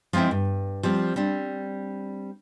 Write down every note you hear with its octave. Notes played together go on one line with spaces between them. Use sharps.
F3 G#3 C4 E4 E5
G2
F3 G3 C4
G3 C4 D4